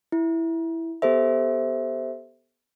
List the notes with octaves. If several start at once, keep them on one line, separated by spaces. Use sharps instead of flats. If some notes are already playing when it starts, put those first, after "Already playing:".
E4
B3 G4 A4 C5 E5